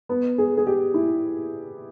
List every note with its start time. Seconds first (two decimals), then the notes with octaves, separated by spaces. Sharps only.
0.09 B3
0.38 G#4
0.57 G#4
0.66 G4
0.94 E4